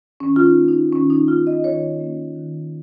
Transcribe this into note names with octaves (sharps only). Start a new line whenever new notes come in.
D#3 C#4
F4
D#4
A#3 C#4
D#4
D#3 C#4
D#4
A#3 C#4 F4
D#5
D#3 C#5
A#3 C#4
D#3